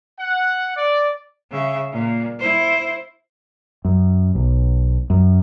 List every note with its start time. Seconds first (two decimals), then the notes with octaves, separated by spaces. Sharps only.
0.20 F#5
0.77 D5
1.51 C#3 E5
1.92 A#2
2.39 E4 C5
3.85 F#2
4.35 B1
5.10 F#2